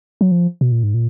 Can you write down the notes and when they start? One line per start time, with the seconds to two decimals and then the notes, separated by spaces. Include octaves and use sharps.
0.21 F#3
0.31 F3
0.61 B2
0.72 A#2
0.83 G#2
0.94 A#2